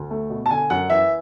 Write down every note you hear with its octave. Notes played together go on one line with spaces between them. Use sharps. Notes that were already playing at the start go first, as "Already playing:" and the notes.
Already playing: D2
A3
B2
A5
D3 G#5
F#2 F#5
E3 E5